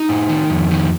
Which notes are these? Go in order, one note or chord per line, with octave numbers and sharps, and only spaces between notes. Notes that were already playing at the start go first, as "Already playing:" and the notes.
Already playing: D#4
A2
D#3
F2
D#3